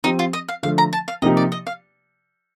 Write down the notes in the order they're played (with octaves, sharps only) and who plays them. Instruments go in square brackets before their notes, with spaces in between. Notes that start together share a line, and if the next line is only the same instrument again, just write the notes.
[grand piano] F3 C4 G4 [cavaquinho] D#4
[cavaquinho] F4
D#5
F5
[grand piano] D3 F3 A3 [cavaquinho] F5
[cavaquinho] A#5
A5
F5
[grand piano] C3 F3 A#3 D#4 G4 [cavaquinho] D#5
[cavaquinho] D5
D#5
F5